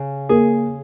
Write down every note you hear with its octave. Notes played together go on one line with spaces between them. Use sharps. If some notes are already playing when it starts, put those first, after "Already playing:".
Already playing: C#3
A#3 G#4